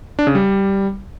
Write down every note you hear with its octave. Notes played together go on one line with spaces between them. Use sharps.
D4
C#3
G3